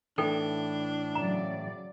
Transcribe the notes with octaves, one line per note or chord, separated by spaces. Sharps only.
A2 E3 D4 D#4 A4 G5
C#3 F#3 D5 A#5